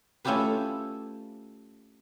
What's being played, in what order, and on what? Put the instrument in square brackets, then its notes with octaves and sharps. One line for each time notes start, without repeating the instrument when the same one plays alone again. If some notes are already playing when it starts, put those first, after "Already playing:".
[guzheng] A3 C#4 E4 F4 G4 B4